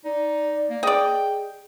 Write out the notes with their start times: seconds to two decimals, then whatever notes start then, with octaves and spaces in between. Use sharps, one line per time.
0.04 D#4 D5
0.70 A#3
0.83 G#4 D5 D#5 G5